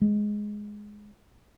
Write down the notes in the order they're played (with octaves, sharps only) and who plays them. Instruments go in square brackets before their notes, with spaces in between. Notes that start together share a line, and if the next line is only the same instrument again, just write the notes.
[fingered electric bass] G#3